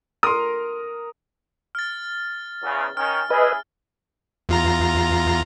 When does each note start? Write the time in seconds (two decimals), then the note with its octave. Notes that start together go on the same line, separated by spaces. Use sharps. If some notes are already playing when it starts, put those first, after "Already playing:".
0.23 A#4 C6 D#6
1.75 F6 A6
2.63 E2 C#3
2.97 D#3 C#4 F6
3.30 C#3 E4 G#4 B4 D#5
4.49 E2 F4 A#5